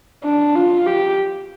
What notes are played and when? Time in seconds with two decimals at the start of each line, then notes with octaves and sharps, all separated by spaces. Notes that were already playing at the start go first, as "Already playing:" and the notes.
0.24 D4
0.55 F4
0.86 G4